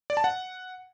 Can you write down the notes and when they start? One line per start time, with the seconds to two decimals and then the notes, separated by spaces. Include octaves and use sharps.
0.10 D5
0.17 A5
0.24 F#5